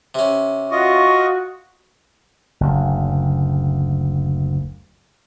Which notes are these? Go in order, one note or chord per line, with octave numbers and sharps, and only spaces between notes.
C3 C#4
F4 F#4 D#5 C#6
F#1 D2